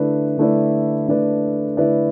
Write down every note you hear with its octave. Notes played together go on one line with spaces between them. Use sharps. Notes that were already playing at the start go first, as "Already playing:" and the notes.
Already playing: D3 A3 E4 B4 D5
D3 A3 E4 B4 D5
D3 A3 E4 B4 D5
D3 A3 E4 B4 D5